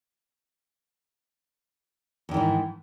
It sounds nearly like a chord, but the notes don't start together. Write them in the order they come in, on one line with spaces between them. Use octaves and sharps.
E2 D#3 E3 G#2